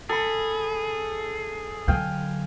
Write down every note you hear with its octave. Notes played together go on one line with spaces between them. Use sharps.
G#4 A4 B5
D3 F#3 F5 G5 G#5